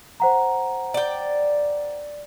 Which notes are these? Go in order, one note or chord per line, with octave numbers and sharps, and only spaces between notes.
C5 F#5 A#5
D5 G5